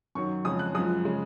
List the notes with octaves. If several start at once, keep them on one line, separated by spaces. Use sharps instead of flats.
F#2 D#3 F#3 C#6
F2 C#3 G#3 D#6
F#6
F#2 F3 G#3 D#6
C#3 G#3